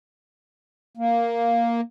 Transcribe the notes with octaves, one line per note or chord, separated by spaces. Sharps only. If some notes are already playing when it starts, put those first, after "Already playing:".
A#3